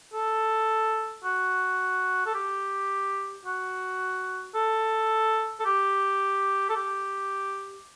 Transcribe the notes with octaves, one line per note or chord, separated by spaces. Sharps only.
A4
F#4
A4
G4
F#4
A4
A4
G4
A4
G4